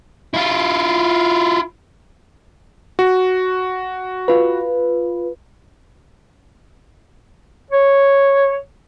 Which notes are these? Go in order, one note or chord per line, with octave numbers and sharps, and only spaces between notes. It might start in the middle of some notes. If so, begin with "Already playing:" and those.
E4 F4
F#4
F4 B4
C#5